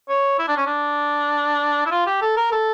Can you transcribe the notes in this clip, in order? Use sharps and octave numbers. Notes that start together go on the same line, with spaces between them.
C#5
E4
D4
C#4
D4
E4
F4
G4
A4
A#4
A4